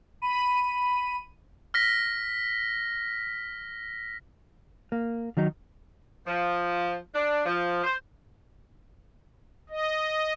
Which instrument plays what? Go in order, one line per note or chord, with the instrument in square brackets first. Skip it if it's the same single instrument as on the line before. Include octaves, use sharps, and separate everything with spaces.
[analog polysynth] B5 D#7
[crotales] F6 A#6 B6
[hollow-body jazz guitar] A#3
D#3 F#3 D#4
[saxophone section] F3
D4
F3
C5
[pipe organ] D#5